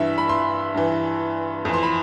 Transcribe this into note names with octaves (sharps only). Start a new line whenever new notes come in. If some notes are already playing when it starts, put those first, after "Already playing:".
Already playing: G2 E3 E5
B5
C6
G2 E3
F2 E3
C6
B5